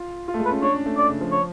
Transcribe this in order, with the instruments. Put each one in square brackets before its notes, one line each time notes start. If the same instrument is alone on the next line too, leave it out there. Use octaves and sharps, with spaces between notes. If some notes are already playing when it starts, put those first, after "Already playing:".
Already playing: [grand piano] F4
F4
A3
G#3
[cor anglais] B4
[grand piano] C#4
[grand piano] D4 [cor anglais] C#5
[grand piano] C#4
A3
[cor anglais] D5
[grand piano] C#3
F3
[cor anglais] C#5